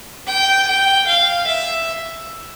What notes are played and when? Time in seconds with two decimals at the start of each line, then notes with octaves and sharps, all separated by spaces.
0.27 G5
0.67 G5
1.07 F5
1.47 E5